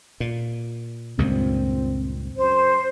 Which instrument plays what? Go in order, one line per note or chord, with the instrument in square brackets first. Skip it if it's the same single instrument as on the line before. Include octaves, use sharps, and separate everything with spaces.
[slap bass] A#2
[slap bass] C#2 G2 A#2 [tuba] C4
[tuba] F#2 [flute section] C5